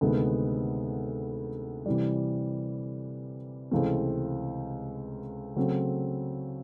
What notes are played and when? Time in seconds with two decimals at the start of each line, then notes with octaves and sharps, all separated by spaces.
0.01 D2 C3 D#3 G#3 B3
1.86 C3 E3 G3
3.71 C#2 C3 E3 A3 C4
5.56 C#3 F#3 A3 C4